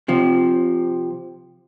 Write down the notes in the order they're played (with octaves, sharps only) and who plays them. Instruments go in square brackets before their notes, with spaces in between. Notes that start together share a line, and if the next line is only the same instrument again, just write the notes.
[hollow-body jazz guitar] C3 F3